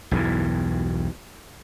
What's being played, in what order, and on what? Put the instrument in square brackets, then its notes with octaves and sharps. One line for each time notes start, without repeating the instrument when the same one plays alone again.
[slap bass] B1 E2 G2 E3